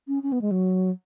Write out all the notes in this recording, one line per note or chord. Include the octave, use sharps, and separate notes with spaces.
C#4
C#4
B3
G#3
F#3